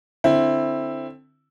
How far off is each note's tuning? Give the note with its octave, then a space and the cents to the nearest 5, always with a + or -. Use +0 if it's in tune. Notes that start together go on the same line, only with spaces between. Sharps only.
D3 +10 C4 +10 E4 +0